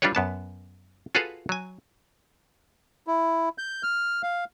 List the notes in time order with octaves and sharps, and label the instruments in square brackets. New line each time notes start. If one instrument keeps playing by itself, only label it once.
[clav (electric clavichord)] G3 D4 F4 G4 B4 C#5
F#2 B3 A5
F4 F#4 G#4 A4 B4 F5
F#3 G#5
[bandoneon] E4
G6
F6
F5